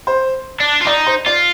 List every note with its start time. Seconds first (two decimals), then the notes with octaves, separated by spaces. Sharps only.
0.07 C5
0.60 D4
0.81 F4
0.86 D#4 D5
1.07 C5
1.26 F4 D5